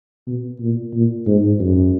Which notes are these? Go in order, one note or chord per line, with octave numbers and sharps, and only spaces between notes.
B2
A#2
A#2
G#2
F#2